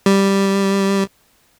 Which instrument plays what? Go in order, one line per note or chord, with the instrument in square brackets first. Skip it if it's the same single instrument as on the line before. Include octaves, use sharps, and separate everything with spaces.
[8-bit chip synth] G3